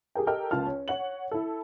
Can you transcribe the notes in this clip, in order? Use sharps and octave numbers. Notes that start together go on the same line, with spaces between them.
G4 G#4 A#4 G5
G4 A4 A#4 D#5 G5 F6
C#2 F4 A5 F6
C#4
C#5 F#5 F#7
E4 A4